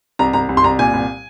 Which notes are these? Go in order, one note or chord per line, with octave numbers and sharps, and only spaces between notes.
C2 A#5
C2 A#5
C2
C6
C2 A#5
A#2 G#5
C2